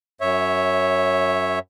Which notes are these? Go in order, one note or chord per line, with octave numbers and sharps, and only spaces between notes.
F#2 C#5 E5